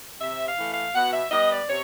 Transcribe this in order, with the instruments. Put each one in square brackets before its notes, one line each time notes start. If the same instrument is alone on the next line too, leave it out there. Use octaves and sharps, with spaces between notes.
[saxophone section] C3 E5
F5
E3 A3
F5
B2 F#5
E5
G3 B3 D#5
D5
C3 C#5